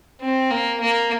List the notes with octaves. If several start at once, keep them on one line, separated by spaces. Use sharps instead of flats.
C4
A#3
A#3